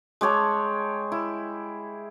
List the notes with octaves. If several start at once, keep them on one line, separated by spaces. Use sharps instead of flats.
G#3 G4 C#5 A5
E4